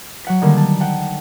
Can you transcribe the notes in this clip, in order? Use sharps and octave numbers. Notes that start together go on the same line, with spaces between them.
F#3 F#5 B6
D3 D#3 G3 G#3 A#3
A5
F#5 G5